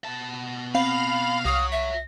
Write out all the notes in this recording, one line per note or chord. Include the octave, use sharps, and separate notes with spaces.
B2 A5
C4 F5 B5
C2 F#4 C#5 D#6
E5